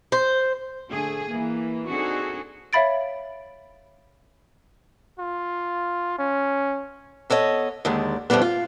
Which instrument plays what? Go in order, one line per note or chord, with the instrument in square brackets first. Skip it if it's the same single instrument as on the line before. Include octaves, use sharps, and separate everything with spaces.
[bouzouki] C5
[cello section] D3 A3 G#4
E3 A#3
C4 D4 D#4 F#4 G#4 A4
[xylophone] C#5 E5 F5 B5 A6 D7
[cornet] F4
C#4
[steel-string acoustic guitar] B3 A4 C#5 D#5
D#2 D3 D#3 G#3
F2 A2 D3 G3 B3
F4